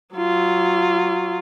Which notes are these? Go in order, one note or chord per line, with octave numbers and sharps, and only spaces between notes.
F#3 F4